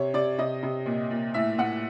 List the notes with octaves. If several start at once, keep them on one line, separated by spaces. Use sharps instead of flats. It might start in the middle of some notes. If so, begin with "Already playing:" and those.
Already playing: C3 C#5
C3 D5
C3 D#5
C3
A#2
A#2
A2 E5
A2 F#5